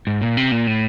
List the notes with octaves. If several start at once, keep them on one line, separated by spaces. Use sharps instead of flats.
G#2
A#2
C3
A#2
A2